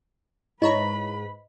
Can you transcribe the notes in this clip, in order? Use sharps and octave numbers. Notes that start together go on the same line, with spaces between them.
G#2 E4 B4 C#5 D#5 A#5 B5